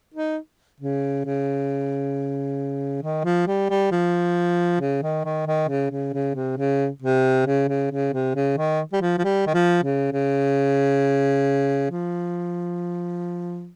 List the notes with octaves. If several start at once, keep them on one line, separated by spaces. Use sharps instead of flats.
D#4
C#3
C#3
D#3
F3
G3
G3
F3
C#3
D#3
D#3
D#3
C#3
C#3
C#3
C3
C#3
C3
C#3
C#3
C#3
C3
C#3
D#3
G3
F3
F3
G3
D#3
F3
C#3
C#3
F3